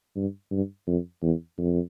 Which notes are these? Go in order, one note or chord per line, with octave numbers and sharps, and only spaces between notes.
G2
G2
F2
E2
F2